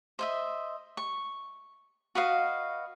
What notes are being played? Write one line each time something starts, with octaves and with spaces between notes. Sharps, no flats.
C5 D#5 E5
C#6
F#4 B4 D#5 F5